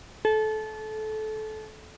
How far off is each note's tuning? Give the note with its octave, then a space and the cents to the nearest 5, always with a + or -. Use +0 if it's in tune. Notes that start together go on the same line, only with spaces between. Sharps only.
A4 -25